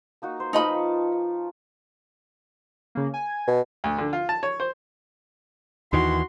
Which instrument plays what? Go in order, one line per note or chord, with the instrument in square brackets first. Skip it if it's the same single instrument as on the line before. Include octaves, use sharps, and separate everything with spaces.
[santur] A#3 D#4 F#4
C5
[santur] F3 F4 B4 [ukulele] D#4 D#5 B5
[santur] A5 C#6
[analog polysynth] C#3 A#3
G#5
[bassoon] B2
[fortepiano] D2
D3
F4
A5
C#5
C5
[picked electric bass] D#2 D#3 E3 [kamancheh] F#4 C6